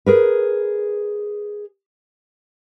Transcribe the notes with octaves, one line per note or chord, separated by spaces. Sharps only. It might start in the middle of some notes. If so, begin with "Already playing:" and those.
G#4 A#4 B4